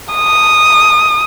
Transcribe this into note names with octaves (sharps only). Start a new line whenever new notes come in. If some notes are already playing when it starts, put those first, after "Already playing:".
D#6